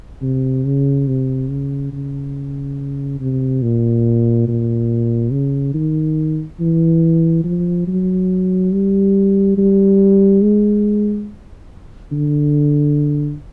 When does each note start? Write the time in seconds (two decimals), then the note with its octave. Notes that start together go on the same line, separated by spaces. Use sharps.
0.22 C3
0.65 C#3
1.07 C3
1.50 C#3
1.92 C#3
3.20 C3
3.62 A#2
4.47 A#2
5.32 C#3
5.74 D#3
6.60 E3
7.44 F3
7.87 F#3
8.72 G3
9.58 G3
10.42 G#3
12.12 D3